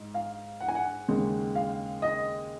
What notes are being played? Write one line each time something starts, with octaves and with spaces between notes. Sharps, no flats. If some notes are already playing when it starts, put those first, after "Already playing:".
Already playing: G#2
F5
F#5
G#5
F#5
D#2 C#3 G#3
F5
D#5